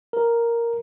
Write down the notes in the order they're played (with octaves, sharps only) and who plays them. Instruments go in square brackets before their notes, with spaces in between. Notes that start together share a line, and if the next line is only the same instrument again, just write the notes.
[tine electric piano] A#4